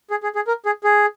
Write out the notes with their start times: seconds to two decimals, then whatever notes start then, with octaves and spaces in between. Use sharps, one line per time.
0.10 G#4
0.23 G#4
0.35 G#4
0.47 A#4
0.66 G#4
0.84 G#4